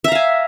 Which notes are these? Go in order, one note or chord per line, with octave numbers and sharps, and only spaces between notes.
E5 F5 G#5 A#5